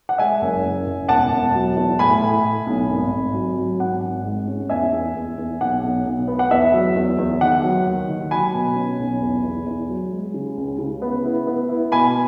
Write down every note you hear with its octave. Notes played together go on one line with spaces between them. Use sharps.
F#5
G#3 E5 G#5
F#1
F#1
F#1
E1 F#5 A5
E1
F#3
E2
A2 G#5 B5
A2
A2
B1
G#1
G#1
F#3
F#3
G#1 F#5
G#1
G#2
C#4
E2 E5 G#5
E2
E2
E2
B1 F#5
B1
B1
B3
F#5
E2 E5
F#3
E2
E2
D#3 F#5
F#3
D#2
D#3
F#3 G#5 B5
B2
C#4
B1
E2
E2
E2
F#3
G#3
C#3
C#2
C#3
B3
E4
B3
E4
B2 G#5 B5